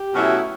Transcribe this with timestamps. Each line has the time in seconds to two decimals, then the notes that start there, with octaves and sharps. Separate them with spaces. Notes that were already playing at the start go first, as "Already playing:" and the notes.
Already playing: G4
0.14 B2 F#3 A3 C#4 E4